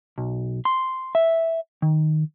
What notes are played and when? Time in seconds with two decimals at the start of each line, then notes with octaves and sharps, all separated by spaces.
0.18 B1
0.65 C6
1.15 E5
1.82 D#3